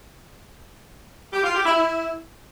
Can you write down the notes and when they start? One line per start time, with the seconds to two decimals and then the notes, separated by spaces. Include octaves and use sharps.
1.33 G4
1.44 F4
1.55 G4
1.66 E4
1.77 E4